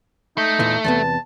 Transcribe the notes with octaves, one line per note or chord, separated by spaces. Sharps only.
A3 D#4
E2 A#2 E3
E2 C3 B3 A5